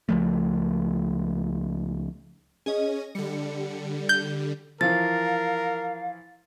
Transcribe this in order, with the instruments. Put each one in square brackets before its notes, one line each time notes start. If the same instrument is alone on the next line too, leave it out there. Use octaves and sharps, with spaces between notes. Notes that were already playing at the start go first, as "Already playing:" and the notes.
[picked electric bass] C#2 F3 A3
[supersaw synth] C#4 [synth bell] G#4 D#5
[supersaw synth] D3 G3 [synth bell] C#7
[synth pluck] G6
[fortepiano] E3 F3 [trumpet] A#4 [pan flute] F5 [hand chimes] A6